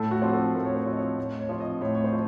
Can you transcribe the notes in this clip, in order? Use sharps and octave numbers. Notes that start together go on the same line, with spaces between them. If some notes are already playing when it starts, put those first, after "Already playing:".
Already playing: A2 A4
F#4
F3 C4
A4
A2 A#4
C#5
C5
F3 C4 D#5
C#5
A2 C#5
C#5
F3 C4
D#5
A2 C#5
C#5
C5
F3